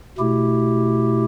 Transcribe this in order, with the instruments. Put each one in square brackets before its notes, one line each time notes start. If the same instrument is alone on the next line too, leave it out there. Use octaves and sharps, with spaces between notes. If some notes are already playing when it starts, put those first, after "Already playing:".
[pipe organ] B2 A3 E4 G4